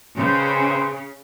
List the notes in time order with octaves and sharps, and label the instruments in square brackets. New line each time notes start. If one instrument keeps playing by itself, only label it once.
[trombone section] D#2 B4 C5 [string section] C#3